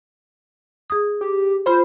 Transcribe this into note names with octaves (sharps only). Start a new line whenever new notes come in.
G#4 D#6
G4
F4 C5 B5 C6